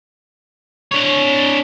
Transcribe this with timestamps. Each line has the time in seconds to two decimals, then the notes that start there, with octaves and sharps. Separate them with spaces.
0.91 D4 C#5